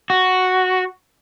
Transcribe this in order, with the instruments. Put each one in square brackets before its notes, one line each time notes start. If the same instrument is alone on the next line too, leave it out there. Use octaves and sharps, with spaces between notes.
[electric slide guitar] F#4